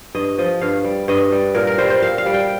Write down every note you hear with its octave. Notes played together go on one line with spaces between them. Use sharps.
G2 D#5
F3 D#5
G2 F5
G3
G2 D#5
G3
A#2 A#4
A#4
G3 C5
C5
A#2 F5
F5
G3
G5